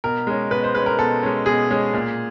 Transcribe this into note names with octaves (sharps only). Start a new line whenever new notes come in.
B2 A#4
G#3 C#4
B2 B4
C5
G#3 C#4 B4
A#4
B2 A4
G#3 C#4
B2 G#4
G#3 C#4
A#2